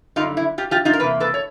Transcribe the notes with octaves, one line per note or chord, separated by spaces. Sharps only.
F#2 D3 G3 D#4 F4
E4
F4 G4
F4 G4
D#4 F4
A#4
E2 C3 A#3 B4
A4 B4
C#5